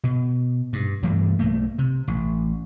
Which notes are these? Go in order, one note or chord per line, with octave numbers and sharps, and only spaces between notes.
B2
G2
G2 E3 G3 A3
B1 A3 A#3
C3
A1